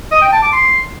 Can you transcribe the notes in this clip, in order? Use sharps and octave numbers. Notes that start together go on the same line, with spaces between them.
D#5
G5
A5
D6
C6